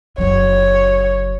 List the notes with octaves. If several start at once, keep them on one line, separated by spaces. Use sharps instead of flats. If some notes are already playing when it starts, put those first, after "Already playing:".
F#1 F#3 C#5